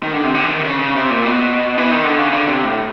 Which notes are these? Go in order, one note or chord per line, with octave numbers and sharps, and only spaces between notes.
D#3
D3
C3
D3
E3
D#3
C#3
C#3
C3
A#2
B2
E3
D#3
D3
C#3
D3
C3
A2